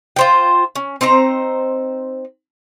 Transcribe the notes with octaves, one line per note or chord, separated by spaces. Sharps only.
F4 C5 G5
C#4
C4 D#4 C5 A#5